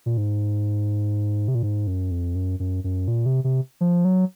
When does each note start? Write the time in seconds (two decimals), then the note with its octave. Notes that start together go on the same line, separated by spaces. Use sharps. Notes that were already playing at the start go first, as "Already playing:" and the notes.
0.06 A#2
0.17 G#2
1.48 C3
1.55 A#2
1.63 G#2
1.87 F#2
2.11 F2
2.35 F#2
2.60 F#2
2.84 F#2
3.08 A#2
3.26 C3
3.44 C3
3.81 F3
4.05 F#3